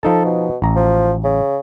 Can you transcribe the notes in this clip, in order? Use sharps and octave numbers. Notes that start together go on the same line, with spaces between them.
F3 D#4 A4 A5
B2
A1 A#5
F3
C#3